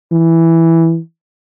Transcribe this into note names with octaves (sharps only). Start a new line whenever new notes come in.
E3